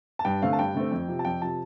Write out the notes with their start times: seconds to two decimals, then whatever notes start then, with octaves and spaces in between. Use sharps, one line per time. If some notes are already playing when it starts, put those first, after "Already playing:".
0.19 A5
0.25 G2 G5
0.42 D3 A3 C4 F5
0.53 A5
0.58 G2 G5
0.75 D3 A3 C4
0.91 F2
1.08 C3 F3
1.19 A5
1.25 F2 G5
1.42 C3 F3 A5